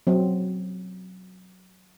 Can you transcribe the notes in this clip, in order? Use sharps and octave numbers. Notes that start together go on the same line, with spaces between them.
F#3 C4